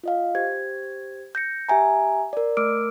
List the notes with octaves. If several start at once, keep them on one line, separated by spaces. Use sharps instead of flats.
F4 D#5 F5
G4 C5 G#6
G6 A#6 C#7
G4 E5 G#5 A#5
A#4 D5
A3 A#4 D6 E6 F6 D7